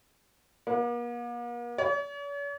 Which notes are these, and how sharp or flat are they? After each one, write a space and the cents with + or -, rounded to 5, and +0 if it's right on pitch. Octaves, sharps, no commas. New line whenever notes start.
A#3 +45
C#5 +45